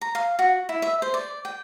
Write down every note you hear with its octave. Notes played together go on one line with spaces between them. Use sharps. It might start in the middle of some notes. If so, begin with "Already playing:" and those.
A#5
F5
F#4
E4
E5
C5
D5
G5